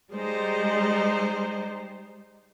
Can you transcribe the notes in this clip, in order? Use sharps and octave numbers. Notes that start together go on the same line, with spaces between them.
G3 G#3 D#4 C5